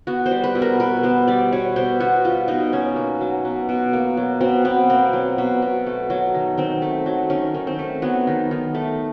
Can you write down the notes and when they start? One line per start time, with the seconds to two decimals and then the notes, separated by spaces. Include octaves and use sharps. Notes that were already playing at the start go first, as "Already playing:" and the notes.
0.07 B3 F#4
0.26 C5
0.31 G3
0.44 B4
0.55 B2
0.62 A#4
0.80 B2 B4
1.03 B3 C5
1.27 G3 D5
1.52 B2 C#5
1.76 B2 C5
2.00 B3 F#4
2.24 G3 F4
2.48 B2 D#4
2.72 B2 C#4
2.96 A#3
3.21 F#3
3.45 B2
3.69 B2
3.93 A#3
4.17 F#3
4.41 B2 C4
4.65 B2 B3
4.90 A#3 C4
5.13 F#3
5.38 B2
5.62 B2
5.86 A3
6.10 F#3
6.34 D#3
6.58 D#3 C4
6.82 A3
7.06 F#3
7.30 D#3 C#4
7.54 D#3
7.67 C4
7.79 A3
8.02 F#3 B3
8.27 D#3
8.51 D#3
8.75 A3